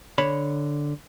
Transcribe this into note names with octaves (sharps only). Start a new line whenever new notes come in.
D3 C#5 A5 B5